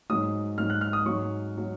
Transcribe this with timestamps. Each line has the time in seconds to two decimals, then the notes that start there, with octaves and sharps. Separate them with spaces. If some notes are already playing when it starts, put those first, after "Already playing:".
0.09 G#2 F#3 D#6
0.58 G#2 F#3 F6
0.70 F#6
0.81 F6
0.93 D#6
1.06 G#2 F#3 C#6
1.58 F#3